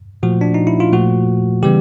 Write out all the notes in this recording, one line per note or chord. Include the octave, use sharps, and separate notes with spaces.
A#2 F3 A3 F#4
D4
D#4
E4
F4
A#2 F3 A3 F#4
C#3 E3 G3 B3 G4